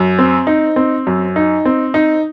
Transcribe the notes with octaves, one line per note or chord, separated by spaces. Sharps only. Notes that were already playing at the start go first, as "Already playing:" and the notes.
Already playing: F#2
C4
D#4
C4
F#2
D#4
C4
D#4